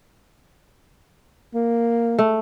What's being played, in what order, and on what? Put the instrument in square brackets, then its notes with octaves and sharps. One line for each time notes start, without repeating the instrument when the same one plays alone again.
[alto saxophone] A#3
[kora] A3